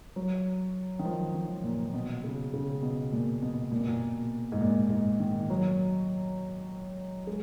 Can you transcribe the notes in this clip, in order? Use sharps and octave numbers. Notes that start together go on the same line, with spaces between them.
F#3
D#3
F3
D#3
A#2
B2
C#3
C#3
B2
A#2
B2
A#2
B2
A#2
G#2
A#2
G#2
D#3
F#3
G#3